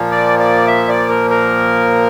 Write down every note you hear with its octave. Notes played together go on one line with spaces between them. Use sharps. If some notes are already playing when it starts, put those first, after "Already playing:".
Already playing: A#2 F3 A#3
D5
D5
E5
D5
A#4
A#4